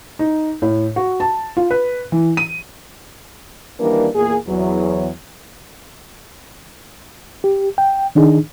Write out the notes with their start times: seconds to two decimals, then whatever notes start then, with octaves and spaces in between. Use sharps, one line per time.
0.19 D#4
0.62 A2
0.96 F#4
1.20 A5
1.57 F4
1.71 B4
2.12 E3
2.37 D#7
3.79 D#3 E3 G3 A#3 D4 A#4
4.15 E2 A#2 A#3 G#4
4.47 E2 F#3
7.44 G4
7.78 G5
8.15 D#3 D4 D#4 G#4